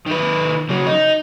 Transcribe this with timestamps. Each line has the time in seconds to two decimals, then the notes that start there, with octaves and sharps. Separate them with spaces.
0.07 D#3 B4
0.69 C#3 F#3
0.87 D#4